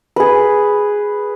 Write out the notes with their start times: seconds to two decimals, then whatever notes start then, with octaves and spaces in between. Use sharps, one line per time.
0.16 G#4 B4